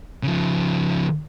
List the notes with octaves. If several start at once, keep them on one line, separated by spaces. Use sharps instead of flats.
C#3 F3